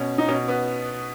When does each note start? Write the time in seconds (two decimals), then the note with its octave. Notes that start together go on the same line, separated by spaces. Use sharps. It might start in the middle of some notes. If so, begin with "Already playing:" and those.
Already playing: B2 C#4
0.18 D#4
0.28 B2 C#4
0.48 B3